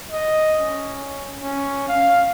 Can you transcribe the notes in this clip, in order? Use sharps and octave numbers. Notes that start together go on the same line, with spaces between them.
D#5
C#4
C#4
F5